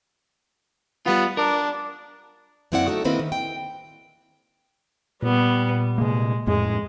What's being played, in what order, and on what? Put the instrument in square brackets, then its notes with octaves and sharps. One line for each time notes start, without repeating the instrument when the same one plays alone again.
[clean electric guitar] G3 F4 [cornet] B3
[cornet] D4 [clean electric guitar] A#4
[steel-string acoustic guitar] F#2 A#3 C4 E4 D5 F#5
A3 D#4 F#4 A4
D#3 A#3 C4 E4 B4 D#5
D#3
G5
[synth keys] A#2 [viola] G3 B3
[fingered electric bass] C3 A#3 [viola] G#3
[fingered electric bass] F2 A2 [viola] G#3